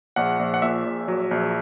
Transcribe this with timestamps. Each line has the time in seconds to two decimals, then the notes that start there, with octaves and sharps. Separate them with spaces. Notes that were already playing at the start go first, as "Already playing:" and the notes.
0.16 A#1 F#5
0.39 A#1
0.54 F#5
0.62 A#2 E5
0.85 A#1
1.08 F#3
1.31 A#1